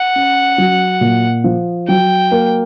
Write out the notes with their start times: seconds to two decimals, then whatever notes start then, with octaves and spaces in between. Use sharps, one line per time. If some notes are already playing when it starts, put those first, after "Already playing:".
Already playing: F#5
0.16 C#4
0.58 F#3
1.01 A#2
1.44 F3
1.88 F#3 G5
2.31 A#3